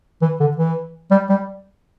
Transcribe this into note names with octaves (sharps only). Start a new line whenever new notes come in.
E3
D3
E3
G3
G3